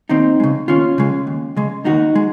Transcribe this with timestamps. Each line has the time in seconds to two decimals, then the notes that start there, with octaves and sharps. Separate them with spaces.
0.09 D#2 C4 D#4
0.40 C#3 G#3
0.68 D#2 C#4 F4
0.98 C#3 G#3
1.27 D#2
1.56 C#3 G#3
1.85 D#2 D#4 F#4
2.15 G#3